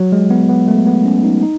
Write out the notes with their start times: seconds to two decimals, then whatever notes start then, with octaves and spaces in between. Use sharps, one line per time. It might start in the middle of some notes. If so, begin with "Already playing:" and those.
Already playing: F#3
0.12 G#3
0.30 B3
0.49 B3
0.68 A3
0.86 B3
1.06 C#4
1.24 D#4
1.42 D#4